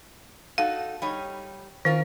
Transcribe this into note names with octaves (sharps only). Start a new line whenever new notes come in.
D#4 F#4 A4 F5
G3 D#4 C#5
D#3 C#4 F4 A#4